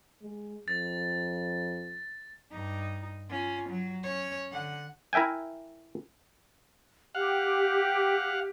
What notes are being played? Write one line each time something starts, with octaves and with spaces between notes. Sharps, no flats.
G#3
F2 A6
G2 D#4
C#4 F4
F#3
C#4 C#5
D3 F#5
E4 A#4 E5 G5 G#5
G4 F5 F#5